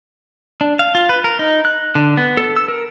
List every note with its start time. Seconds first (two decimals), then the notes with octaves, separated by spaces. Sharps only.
0.61 D4
0.79 F5
0.95 F4
1.09 B4
1.24 A#4
1.39 D#4
1.65 F#6
1.95 D3
2.17 B3
2.37 A4
2.56 E6
2.68 A#4